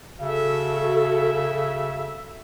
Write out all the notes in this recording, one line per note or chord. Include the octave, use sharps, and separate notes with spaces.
C#3 F#4 A4 E5